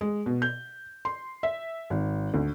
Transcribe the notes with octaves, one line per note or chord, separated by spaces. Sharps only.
G#3
B2
G6
C6
E5
G#1
D2